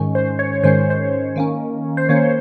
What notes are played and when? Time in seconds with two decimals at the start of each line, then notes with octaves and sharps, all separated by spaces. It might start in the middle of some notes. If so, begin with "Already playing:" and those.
Already playing: G#2 D#3 G#3 C#4
0.15 C5
0.39 C#5
0.63 G#2 D#3 G#3 C#4 C5
0.90 C5
1.36 D#3 A#3 C#4
1.97 C5
2.09 D#3 A#3 C#4 C#5